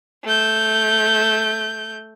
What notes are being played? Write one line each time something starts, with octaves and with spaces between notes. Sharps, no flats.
A3 G6